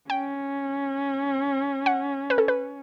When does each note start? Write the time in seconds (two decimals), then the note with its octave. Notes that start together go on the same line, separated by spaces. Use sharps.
0.10 C#4 G5
1.86 F#5
2.30 B4
2.38 A4
2.48 B4